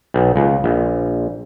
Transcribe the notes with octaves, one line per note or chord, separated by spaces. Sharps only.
B1
C#2
A#1